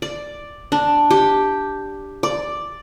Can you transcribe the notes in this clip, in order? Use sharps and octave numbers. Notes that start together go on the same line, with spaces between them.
D5
D4
G4
D5